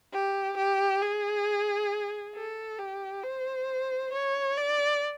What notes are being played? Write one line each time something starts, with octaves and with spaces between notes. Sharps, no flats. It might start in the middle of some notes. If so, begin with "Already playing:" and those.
G4
G4
G#4
A4
G4
C5
C#5
D5